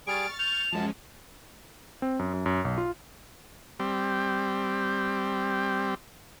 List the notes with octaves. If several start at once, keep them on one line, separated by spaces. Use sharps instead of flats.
G3 G#4 C#6 F6 A6 D7
G6 F7
F#2 F3 G#3 C#4 A5
C4
F#2
F#2
F#2
B1
F4
G3 C4